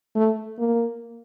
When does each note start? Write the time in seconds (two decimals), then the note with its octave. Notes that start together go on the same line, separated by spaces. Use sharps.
0.16 A3
0.59 A#3